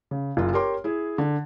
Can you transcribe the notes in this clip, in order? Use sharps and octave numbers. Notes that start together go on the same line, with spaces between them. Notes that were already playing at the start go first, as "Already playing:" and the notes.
C#3
F#1 F4
G4 A#4 C#5 C6 D6
E4 G#4
D3